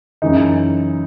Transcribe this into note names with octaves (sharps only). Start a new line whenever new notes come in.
F#2 C#3 E3 G#3 D#4